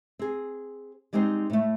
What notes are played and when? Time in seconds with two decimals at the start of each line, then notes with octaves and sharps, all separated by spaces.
0.19 C4 G#4
1.13 G3 G#3 C4 D#4 C5
1.50 A2 A3